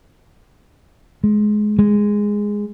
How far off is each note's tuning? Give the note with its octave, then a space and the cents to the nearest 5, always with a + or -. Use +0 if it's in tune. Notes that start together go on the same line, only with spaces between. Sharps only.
G#3 +20
G#3 -10